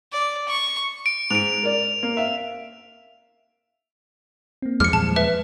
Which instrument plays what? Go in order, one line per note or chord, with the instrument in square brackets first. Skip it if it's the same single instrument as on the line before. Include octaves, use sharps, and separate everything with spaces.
[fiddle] D5
C#6
[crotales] D7
[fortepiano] G#2 [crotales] D7 F7
[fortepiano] A#4 D5
A#3
E5 F5
[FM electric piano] A#3 C4
[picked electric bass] E2 F3 G#3 [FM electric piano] D6 [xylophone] F6 C#7
[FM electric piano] A#2 E3 G3 [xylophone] A5
[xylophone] B4 E5